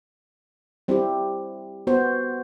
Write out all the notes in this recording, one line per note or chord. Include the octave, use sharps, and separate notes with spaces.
G3 C4 E4 G4
B3 F#4 C5